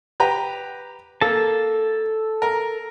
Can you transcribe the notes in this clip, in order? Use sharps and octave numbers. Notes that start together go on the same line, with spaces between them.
G4 B4 A#5
A#3 A4 A5
A#4